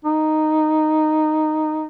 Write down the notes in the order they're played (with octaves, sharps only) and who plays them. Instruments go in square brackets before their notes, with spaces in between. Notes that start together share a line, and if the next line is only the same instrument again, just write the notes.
[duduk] D#4